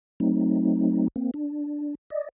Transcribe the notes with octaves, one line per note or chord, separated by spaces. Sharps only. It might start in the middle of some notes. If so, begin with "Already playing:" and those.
F#3 A3 C4 D#4
A#3 C4
D4
D5 D#5